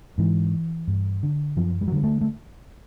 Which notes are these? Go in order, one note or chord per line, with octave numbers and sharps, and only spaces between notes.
G#2 E3
G2
D3
F#2 F3
G3
F#3
D3 G3
A3
A3